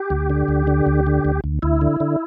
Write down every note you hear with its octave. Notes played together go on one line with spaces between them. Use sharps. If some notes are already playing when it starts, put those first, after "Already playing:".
Already playing: G4
D2
D3
D2
D3
D2
D3
D2
D2
D2 E4
D3
D3